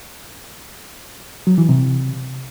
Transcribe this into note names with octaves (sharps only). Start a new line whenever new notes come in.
F#3
E3
C3